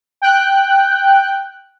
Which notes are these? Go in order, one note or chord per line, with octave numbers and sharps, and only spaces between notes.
G5 F#6